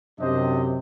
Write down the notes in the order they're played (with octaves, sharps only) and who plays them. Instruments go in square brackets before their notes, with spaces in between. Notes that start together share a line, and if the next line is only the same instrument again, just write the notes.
[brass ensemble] F#2 C3 [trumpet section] D4 C5 D#5